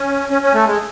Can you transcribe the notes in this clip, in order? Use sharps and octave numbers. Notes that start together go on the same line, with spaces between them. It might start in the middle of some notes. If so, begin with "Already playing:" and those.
Already playing: C#4
C#4
C#4
A3
G#3